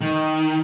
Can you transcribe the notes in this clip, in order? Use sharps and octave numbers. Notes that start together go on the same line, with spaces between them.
D#3